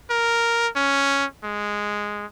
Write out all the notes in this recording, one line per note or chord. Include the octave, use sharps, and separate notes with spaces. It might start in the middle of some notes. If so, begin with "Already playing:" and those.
A#4
C#4
G#3